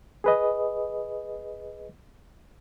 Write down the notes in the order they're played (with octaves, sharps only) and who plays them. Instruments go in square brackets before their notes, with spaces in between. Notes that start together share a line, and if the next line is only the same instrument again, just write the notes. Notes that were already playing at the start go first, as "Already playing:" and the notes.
[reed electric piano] G#4 B4 D#5